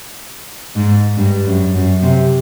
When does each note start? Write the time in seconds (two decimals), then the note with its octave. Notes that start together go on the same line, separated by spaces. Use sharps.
0.76 G#2
1.18 G2
1.46 F#2
1.75 F#2
2.03 C3